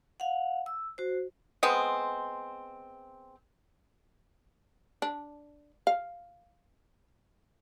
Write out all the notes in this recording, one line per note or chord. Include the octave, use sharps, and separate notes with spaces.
F5 F#5
E6
F#4 C5
G#3 B3 C4
D4
F5